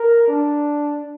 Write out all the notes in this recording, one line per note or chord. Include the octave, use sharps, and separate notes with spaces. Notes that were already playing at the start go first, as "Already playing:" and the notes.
Already playing: A#4
D4